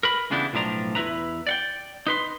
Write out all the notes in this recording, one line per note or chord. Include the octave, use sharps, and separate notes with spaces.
A#4 B4 B5
C#3 E3 B3 D4 E4 G4
B1 A2 F3 D4 A#5
E2 G#2 E4 B4 A#5
D5 F#5 G5
D#4 B4 C6